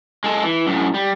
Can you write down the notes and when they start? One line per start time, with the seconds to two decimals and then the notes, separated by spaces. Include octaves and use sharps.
0.24 G#3 A4
0.43 E3
0.67 F#2 A2
0.94 G3